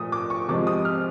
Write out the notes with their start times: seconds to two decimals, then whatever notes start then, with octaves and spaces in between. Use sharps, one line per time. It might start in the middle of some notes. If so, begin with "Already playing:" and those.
Already playing: A#2 F3 A3 D#6
0.12 D6
0.30 C#6
0.49 C3 F3 G#3 D6
0.67 D#6
0.85 F6